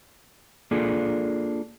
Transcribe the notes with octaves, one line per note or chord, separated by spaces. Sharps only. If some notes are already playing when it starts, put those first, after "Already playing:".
A#3 D4 F4 G#4 A4